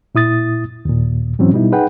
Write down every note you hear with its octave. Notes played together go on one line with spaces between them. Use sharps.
A#2 E4 D#6 A6
D#2 A#2
G#2 E3 F#3 C4 C#4
B2 G3 B3 D#4 E4
D#4 G#4 B4 F#5 G5